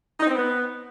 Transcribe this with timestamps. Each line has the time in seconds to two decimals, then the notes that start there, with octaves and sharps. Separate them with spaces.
0.19 D#4
0.27 C4
0.35 B3